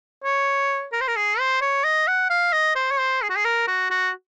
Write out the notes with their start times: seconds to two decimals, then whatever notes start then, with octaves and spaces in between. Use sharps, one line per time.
0.24 C#5
0.93 A#4
1.01 C5
1.08 A#4
1.16 G#4
1.39 C5
1.61 C#5
1.84 D#5
2.08 F#5
2.30 F5
2.52 D#5
2.75 C5
2.91 C#5
2.99 C5
3.22 G#4
3.30 F#4
3.36 G#4
3.45 A#4
3.68 F#4
3.90 F#4